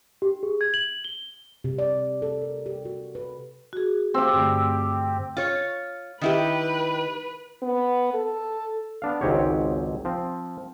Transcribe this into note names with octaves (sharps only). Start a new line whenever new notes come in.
G4
G#4
G#6
F#7
G7
C3
D5
A4
A#4
G4
F#4
B4
F#4 G#4
C4 G4
G2 D3 A3
F4 C#5
D#3 E4 G4 B4
B3
A4
B3 D4 F5
G#1 C#2 G#2 C4 G4 C#5
F3 C4